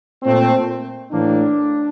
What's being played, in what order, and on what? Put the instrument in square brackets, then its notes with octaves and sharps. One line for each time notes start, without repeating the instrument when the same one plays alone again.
[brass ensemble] A#2 A3 C4
A2 E3 A#3 D4